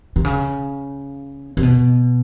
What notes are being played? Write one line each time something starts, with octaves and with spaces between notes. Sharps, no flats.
C3
C#3
C3
B2